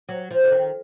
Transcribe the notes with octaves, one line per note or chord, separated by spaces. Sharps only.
F#3
F3
D3
D#3